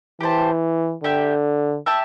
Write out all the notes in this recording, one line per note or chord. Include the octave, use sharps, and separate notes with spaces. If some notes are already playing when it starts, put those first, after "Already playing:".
E3 G4 C5 A5
D3 G4 E5 G5
G4 E5 A5